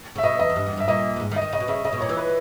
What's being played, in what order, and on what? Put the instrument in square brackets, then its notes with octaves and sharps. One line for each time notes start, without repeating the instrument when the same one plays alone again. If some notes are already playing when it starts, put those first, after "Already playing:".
[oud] C#3
[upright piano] E5
[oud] B2 [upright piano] D#5
[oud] E2 [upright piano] D#5
[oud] E2
G2
E2
[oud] G2 [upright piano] E5
[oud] A#2 [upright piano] D#5
[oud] G2
G#2
D#3
[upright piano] D#5
[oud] D#3
[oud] C#3 [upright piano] D#5
[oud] B2
[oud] C#3 [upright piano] E5
[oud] C#3 [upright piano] D#5
[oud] B2
[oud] A#2 [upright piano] C#5
[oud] E3
[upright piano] B4